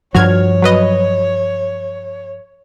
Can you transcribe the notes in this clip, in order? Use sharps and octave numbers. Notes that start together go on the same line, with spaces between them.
G2 F3 F#4 C#5 F6 G#6
F#3 B4 D#5